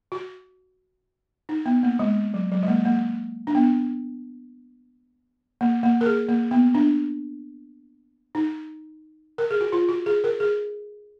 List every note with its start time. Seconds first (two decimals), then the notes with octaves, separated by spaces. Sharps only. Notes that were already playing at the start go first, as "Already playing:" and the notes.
0.12 F#4
1.49 D#4
1.66 B3
1.83 A#3
1.99 G#3
2.34 F#3
2.52 F#3
2.63 G#3
2.68 A#3
2.85 A#3
3.47 D4
3.55 B3
5.61 A#3
5.83 A#3
6.01 A#4
6.06 G#4
6.29 A#3
6.51 B3
6.75 D4
8.35 D#4
9.38 A#4
9.51 G#4
9.61 F#4
9.72 F4
9.89 F#4
10.06 G#4
10.24 A#4
10.40 G#4